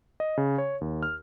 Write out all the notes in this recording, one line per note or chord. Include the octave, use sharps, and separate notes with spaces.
D#5
C#3
C#5
D#2
F6